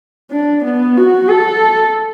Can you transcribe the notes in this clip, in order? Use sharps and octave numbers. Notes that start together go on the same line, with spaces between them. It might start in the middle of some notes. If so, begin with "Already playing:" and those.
D4
B3
F#4
A4